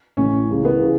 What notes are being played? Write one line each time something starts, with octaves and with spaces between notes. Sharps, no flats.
A1 A2 E3 C#4
C#2 C#3 E3
B3
C#3 E3